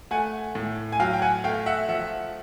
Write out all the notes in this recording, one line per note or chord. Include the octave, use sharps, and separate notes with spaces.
A3 F#5 G#5
A2
G#5
F#3 F5 G5
G5
F#5 G#5
A3 F5 G5
E5 F#5
F3 E5 F#5